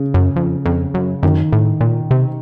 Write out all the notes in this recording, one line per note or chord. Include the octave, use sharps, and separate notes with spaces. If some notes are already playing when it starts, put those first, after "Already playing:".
Already playing: C#3
F#2
F2
F2
F#2
F#2 D#3
A2
A#2
C3